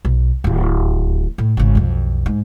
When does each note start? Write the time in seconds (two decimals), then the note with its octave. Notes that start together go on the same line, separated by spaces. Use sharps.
0.05 B1
0.44 D1 D#2
1.38 A2
1.57 G#1 C#3
1.75 B1 F2
2.26 G#2